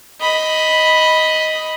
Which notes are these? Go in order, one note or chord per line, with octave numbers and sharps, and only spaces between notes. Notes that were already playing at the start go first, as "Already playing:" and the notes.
D#5 B5